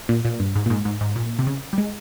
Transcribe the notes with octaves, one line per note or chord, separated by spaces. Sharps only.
A#2
A#2
G2
G#2
A#2
G#2
G#2
G#2
A#2
C3
C#3
G3
G#3